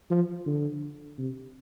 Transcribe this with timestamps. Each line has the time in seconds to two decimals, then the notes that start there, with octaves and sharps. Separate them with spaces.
0.10 F3
0.46 D3
1.18 C3